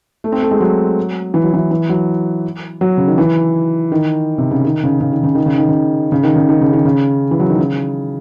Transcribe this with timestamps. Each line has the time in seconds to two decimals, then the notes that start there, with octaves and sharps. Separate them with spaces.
0.24 A3
0.32 C4
0.43 A3
0.51 G#3
0.60 F#3
1.34 E3
1.44 F#3
1.54 E3
1.71 E3
1.89 F#3
2.81 F#3
2.98 C#3
3.08 D#3
3.18 E3
3.92 D#3
4.38 C3
4.51 C#3
4.65 D#3
4.84 C#3
5.01 C#3
5.13 D#3
5.23 C#3
5.35 D#3
5.46 C#3
5.58 D#3
5.69 C#3
6.12 C#3
6.23 D#3
6.36 C#3
6.49 D#3
6.61 C#3
6.73 D#3
6.85 C#3
7.31 E3
7.40 F#3
7.50 D#3
7.58 C#3